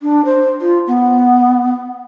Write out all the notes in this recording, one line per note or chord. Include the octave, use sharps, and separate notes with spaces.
D4
C5
F4
B3